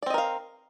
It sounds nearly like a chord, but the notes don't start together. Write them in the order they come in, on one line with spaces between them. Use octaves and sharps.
D5 C4 D#5 A#4 F5